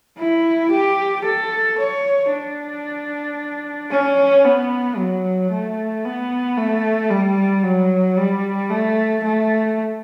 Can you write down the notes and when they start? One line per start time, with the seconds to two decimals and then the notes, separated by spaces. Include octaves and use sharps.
0.18 E4
0.71 G4
1.24 A4
1.78 C#5
2.31 D4
3.91 C#4
4.44 B3
4.97 F#3
5.51 A3
6.05 B3
6.57 A3
7.11 G3
7.63 F#3
8.17 G3
8.70 A3
9.24 A3